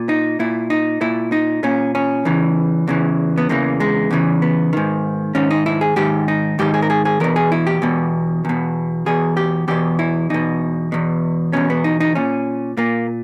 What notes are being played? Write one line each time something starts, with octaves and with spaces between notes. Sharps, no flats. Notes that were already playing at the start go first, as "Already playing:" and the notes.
Already playing: A#2
D#4
A#2 E4
D#4
A#2 E4
D#4
A#2 C#4
C#4
E2 C#3 E3
E2 C#3 E3
B3
E2 C#3 E3 A#3
G#3
E2 C#3 E3
B3
G#2 D#3
G#2 D#3 C#4
D#4
E4
G#4
G#2 D#3 G4
D#4
G#2 D#3 G4
G#4
A#4
G#4
G#4
E2 B2 A#4
G#4
E4
G4
E2 B2
E2 B2
E2 B2 G#4
G4
E2 B2 G4
E4
E2 B2 D#4
E2 B2
E2 B2 C#4
B3
D#4
D#4
A#2 C#4
A#2 A#3